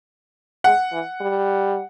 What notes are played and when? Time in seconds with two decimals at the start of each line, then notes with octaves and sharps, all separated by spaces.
0.64 G#3 F#5
0.92 E3
1.21 G3